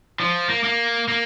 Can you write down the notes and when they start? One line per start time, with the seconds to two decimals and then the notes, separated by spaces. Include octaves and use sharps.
0.20 F3
0.49 A#3
0.64 A#3
1.08 A#3